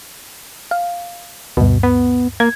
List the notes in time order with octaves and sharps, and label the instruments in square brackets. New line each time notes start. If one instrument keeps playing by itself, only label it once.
[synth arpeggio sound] F5
[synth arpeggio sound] D2 G2 [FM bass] B2
[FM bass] B3
[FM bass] A#3 [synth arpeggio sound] G#6